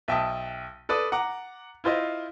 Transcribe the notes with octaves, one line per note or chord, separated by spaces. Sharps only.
B1 E5 G5 A5 D#6
A4 B4 D5 D#6
F#5 A#5 D6
E4 F4 C5 D#5